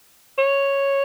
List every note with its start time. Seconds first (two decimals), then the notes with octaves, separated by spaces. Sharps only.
0.38 C#5